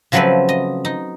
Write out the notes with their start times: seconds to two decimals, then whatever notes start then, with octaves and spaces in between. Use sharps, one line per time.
0.12 C#3 F3 F#3 A3 C4 B4
0.49 D#5
0.85 D#4